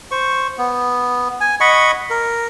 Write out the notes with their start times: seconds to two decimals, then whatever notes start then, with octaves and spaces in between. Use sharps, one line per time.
0.11 C5 C#6
0.58 B3
1.40 G#5
1.60 D#5 F#5 B5 C#6
2.10 A#4